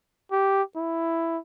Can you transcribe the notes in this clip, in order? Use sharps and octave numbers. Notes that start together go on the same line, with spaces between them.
G4
E4